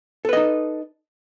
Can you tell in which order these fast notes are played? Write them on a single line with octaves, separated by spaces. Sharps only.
A4 B4 D#5 D#4